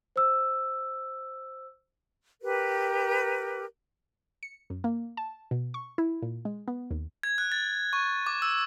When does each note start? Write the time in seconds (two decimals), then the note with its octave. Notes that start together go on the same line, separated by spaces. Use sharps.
0.16 C5 E6
2.42 G4 A#4 B4
4.43 C#7
4.70 F#2
4.84 A#3
5.17 A5
5.51 B2
5.74 C#6
5.98 E4
6.22 A#2
6.45 G#3
6.68 B3
6.91 D#2
7.23 G#6
7.38 F#6
7.52 A6
7.93 C#6
8.27 D6
8.42 E6